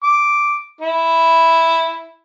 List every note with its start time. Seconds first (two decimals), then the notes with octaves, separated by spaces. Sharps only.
0.03 D6
0.81 E4